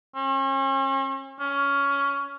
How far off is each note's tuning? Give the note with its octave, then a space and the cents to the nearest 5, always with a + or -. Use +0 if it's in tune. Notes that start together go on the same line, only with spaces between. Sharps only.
C#4 -40
C#4 +15